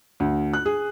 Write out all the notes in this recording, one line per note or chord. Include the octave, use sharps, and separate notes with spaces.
D2
F#6
G#4